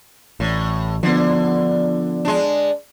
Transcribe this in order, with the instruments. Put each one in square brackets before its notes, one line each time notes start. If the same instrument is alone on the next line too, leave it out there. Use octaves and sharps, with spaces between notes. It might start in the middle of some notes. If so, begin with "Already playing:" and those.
[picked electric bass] A1 [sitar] A2
[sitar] D3 [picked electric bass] F3 B3
[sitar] G#3 D4